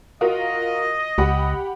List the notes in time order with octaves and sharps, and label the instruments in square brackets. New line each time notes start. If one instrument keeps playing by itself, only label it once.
[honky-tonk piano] F4 F#4 A#4 [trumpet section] D#5
[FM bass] C#2 [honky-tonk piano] G4 F#5 B5